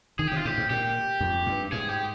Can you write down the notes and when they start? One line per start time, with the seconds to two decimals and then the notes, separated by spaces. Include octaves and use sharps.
0.19 D#3 G#4
0.27 C3 G4
0.37 F4
0.45 G#2 G4
0.58 G#2
0.70 A#2 G4
1.21 F2
1.46 G2
1.72 G#2 G#4
1.89 G4